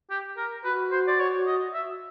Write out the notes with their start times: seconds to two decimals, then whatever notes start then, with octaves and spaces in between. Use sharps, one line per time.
0.10 G4
0.37 A#4
0.65 F#4 B4
0.92 C5
1.08 D5
1.20 C#5
1.47 D#5
1.74 E5